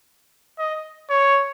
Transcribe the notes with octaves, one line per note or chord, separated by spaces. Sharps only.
D#5
C#5